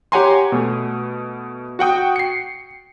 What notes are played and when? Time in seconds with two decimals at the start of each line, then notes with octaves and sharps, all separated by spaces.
0.12 G4 C#5 F#5 G#5 A#5 C6
0.52 B2 A3
1.79 F#4 F#5 G5 D#6
2.16 C7 C#7